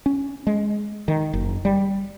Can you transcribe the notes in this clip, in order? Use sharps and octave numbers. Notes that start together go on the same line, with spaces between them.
C#4
G#3
D#3
F#1
G3